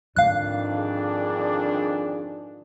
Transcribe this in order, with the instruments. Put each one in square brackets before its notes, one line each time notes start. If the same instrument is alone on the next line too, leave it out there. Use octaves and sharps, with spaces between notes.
[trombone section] F2 D#3 D4 [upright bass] G#2 D3 [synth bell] F5 F#6
[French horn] G#4